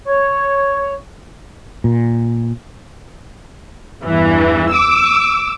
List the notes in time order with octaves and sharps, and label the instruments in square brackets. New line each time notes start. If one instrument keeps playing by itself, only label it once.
[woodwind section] C#5
[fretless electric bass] A#2
[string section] E2 G2 E3
D6 E6